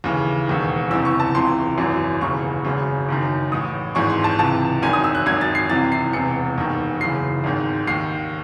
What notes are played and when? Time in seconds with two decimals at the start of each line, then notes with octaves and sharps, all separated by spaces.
0.04 D#2 C#3 E3
0.47 E1 D#2 D#3
0.90 F#1 E2 C3 E3 E6
1.05 C#6
1.20 A5
1.34 C#2 C3 E3 C6
1.78 G#1 F#2 E3
2.21 E1 D#2 C#3 E3 C#6
2.65 G#1 F#2 C#3
3.09 F#1 F#2 D#3
3.51 A1 A2 E3 D#6
3.95 G#1 G#2 E3 C#6
4.10 C6
4.24 A5
4.39 C#2 C3 E3 A5
4.82 G#1 F#2 D#3 G#5
4.93 D#6
5.04 E6
5.15 F#6
5.26 G#1 F#2 D#3 G#6
5.41 A6
5.55 C7
5.70 C2 C3 E3 A6
5.92 C7
6.13 E1 E2 C3 E3 C#7
6.57 E1 D#2 D#3
7.00 F#1 F#2 C#3 E3 C7
7.44 G#1 G#2 D#3
7.87 D#2 D#3 C7